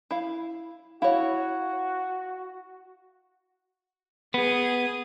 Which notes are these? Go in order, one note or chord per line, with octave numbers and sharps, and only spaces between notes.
E4 F5
E4 F#4 C#5 F5
B3 G#4 D#6